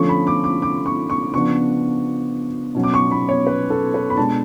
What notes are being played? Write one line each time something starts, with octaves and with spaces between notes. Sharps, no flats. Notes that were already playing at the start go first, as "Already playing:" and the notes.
Already playing: D3 F3 A3 C#4 C#6
B5
D6
D6
D6
C#6
C#6
C#3 F3 B3 D4 C#6
B2 F#3 C#4
D6
C#6
B5
C#5
B4
A4
B4
B5
B2 G#3 D4 A5